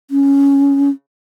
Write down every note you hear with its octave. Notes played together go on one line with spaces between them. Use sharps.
C#4